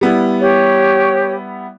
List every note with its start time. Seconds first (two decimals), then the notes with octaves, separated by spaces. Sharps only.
0.01 G3 B3 E4
0.40 G4 C#5